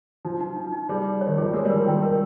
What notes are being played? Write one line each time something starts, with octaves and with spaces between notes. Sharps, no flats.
F3 D#4
D#4
D#4
D#4
G3 G#4
G#4
C#5
D#3
F3 G#4
G3
G#3 A#4
G3
A#4
F3
D#3 G5
A#4